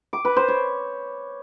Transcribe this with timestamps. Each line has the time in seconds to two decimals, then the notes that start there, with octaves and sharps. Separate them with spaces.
0.13 D6
0.25 B4
0.36 C5
0.48 C#5